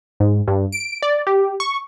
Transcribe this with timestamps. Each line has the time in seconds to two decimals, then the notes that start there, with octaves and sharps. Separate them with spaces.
0.20 G#2
0.48 G2
0.72 D7
1.02 D5
1.27 G4
1.60 C#6